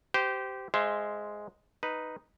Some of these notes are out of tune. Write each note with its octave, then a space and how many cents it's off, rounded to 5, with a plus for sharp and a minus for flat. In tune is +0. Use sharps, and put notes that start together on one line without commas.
G4 -15 C5 -25
G#3 +0 C5 +0 E5 +35
D#4 +0 B4 +0